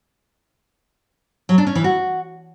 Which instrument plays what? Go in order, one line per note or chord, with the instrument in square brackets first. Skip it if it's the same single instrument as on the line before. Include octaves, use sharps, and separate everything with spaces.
[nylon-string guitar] F#3
D4
C#4
E3
F#4